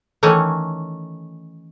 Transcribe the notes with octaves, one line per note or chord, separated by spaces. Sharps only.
D#3 E3 A3 C#4 C#5